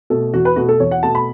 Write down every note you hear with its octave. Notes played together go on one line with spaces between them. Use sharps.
B2 A3 A4
E2 F#4
B4
B2 A3 F#4
A4
E2 C#5
F#5
B2 A3 A5
B5